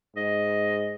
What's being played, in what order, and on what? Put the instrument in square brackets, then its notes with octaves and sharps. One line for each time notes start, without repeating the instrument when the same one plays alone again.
[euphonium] G#2 [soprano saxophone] D#5